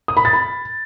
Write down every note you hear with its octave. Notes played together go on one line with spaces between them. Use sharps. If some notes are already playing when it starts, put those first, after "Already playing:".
D#6
B5
A6
B5